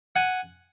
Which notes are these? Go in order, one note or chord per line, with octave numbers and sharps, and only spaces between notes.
F#5 G#5